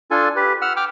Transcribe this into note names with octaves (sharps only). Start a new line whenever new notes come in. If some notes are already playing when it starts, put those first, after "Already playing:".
D4 F4 A4 G#5
G4 B4
F#5 E6 F6
G5 D6 F6